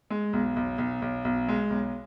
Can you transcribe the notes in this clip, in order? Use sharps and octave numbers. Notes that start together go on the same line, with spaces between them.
G#3
B1
B1
B1
B1
B1
G#3
B1